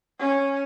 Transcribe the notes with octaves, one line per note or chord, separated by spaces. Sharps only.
C#4